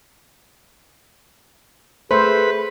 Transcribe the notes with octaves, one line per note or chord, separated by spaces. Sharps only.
A3 G#4 B4 C5